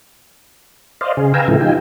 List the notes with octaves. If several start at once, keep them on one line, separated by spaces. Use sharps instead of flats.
C5 D5 D#5 F5
C#3 G#4
B4 F5 G5 G#5 A#5 E6
A2 C#3 F3 E4 A4
D#4 F4 G4 G5 G#5